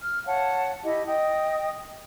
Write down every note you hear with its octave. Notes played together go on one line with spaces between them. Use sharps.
F6
C#5 F5 F#5 A5
E4 G4 D#5
D#5 G5 D#6